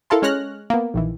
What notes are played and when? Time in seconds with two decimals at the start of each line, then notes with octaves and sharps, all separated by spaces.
0.10 E4 A4 A#4 F5 A5 C6
0.22 G#3 C#4 C#5 F6 F#6 A#6
0.70 A#3 B3
0.94 A#1 D#3 E3